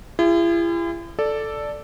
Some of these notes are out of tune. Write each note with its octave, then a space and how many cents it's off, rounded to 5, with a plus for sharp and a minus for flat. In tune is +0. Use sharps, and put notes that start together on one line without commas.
E4 +45 G#4 -40
A4 +0 D5 +0